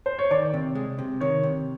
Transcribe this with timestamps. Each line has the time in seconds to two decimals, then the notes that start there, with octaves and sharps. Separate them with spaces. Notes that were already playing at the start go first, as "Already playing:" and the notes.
0.06 C5
0.19 C#5
0.31 D#3 D5
0.54 C3
0.75 G#3
0.99 C3
1.21 D#3 C#5
1.43 C3